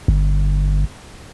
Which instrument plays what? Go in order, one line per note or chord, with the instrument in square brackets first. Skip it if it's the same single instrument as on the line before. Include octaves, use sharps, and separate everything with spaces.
[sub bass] G1